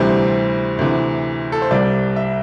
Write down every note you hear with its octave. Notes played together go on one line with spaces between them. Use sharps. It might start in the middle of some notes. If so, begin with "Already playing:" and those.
Already playing: D2 C3 E3 G3 C5
D2 C3 E3
A4
C5
C2 C3 G3 D5
E5